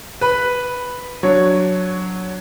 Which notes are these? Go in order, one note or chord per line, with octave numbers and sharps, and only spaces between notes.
B4 B5
F#3 D4 C#5